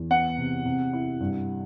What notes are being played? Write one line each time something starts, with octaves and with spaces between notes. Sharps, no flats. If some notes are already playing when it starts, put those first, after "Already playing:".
Already playing: E2
B3 F#5
C3
C3
E4
G2